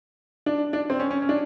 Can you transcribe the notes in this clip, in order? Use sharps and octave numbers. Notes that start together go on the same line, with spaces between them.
D4
D4
C4
C#4
C#4
C#4
D4